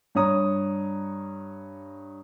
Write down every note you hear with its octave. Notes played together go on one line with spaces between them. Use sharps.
G2 C#5 A#5 D#6